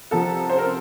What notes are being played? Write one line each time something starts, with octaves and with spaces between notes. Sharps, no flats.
C2 C3 F3 A4
C5
A#4